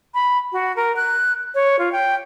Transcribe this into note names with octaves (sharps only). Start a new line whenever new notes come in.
B5
F#4
A#4
F#6
C#5
F4
G5